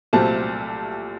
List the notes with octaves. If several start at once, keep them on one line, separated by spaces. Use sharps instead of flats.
C2 A#2 F#3 A3 C4 A5